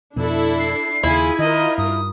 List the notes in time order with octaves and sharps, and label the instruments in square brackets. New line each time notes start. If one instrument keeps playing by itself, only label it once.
[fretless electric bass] F2 B2 [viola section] D4 E4 A4
[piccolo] C7
[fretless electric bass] D#2 C#3 [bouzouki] E4 [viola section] F4 G#4 G#5
[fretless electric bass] D#3 [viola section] D#4 F4 A#4 [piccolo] D#5
[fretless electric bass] G2 [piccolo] D#6